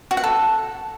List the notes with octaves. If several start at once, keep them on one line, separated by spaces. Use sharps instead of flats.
F#4
F#5
A4